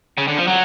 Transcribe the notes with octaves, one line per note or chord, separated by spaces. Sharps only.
C#3
D3
F3
F#3